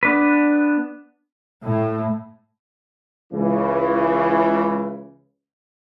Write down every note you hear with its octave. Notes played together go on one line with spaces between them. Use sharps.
B3 D4 B4
A2
C#2 C#3 E3